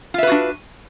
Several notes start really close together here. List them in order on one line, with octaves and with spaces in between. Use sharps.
F4 E5 B4 F#4 D4